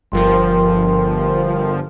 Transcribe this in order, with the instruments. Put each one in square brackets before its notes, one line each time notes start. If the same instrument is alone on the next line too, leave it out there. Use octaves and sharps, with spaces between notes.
[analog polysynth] G1 F3 [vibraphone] A#4 G5 C6